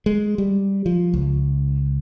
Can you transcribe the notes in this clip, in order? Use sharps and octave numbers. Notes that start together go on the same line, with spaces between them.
G#3
G3
F3
C#2